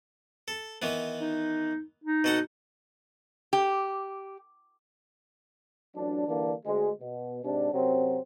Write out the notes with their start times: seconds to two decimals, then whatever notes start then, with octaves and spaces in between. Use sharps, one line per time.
0.48 A4
0.82 D#3 E3 B3
1.20 D#4
2.04 D#4
2.24 B2 A4 F#5
3.53 G4
5.96 A1 F#3 D4
6.28 D3 E3 G3 A#3 D4
6.66 D2 G#3
7.01 B2
7.44 G#2 C3 D4
7.73 F#2 C3 F#3 C4